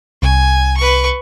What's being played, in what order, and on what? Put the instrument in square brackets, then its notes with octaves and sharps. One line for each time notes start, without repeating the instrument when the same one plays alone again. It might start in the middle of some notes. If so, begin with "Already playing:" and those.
[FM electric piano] C2 [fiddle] G#5
[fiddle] B4 C#6